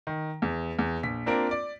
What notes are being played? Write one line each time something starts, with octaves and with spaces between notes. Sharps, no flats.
D#3
E2
E2
A#1 B6
A#3 C4 D4 F4 A#4
D5